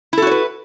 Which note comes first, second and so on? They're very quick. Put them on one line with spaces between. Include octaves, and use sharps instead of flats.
E4 A4 F#4 C#5 B4